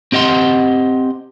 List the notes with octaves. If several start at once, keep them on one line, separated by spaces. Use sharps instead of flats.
C4 G4 D#5 F#5 C6